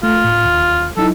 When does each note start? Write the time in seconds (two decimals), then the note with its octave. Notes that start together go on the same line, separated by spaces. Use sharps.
0.03 A3 F4
0.24 A2
0.45 D#2
0.97 F#3 D#4 E4 A4